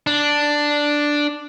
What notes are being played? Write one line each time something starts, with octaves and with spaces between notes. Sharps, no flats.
D4